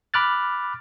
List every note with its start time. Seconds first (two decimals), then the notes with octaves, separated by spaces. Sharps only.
0.14 B5 D6 F6 F#6 A6